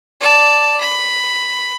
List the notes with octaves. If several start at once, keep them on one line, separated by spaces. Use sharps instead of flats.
D5 A5
B5